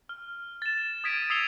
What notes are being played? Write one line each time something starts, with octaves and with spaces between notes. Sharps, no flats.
F6
A6 E7
D#6 G#6 B6 D7 D#7
D#6 E6 C7 C#7 F7 G7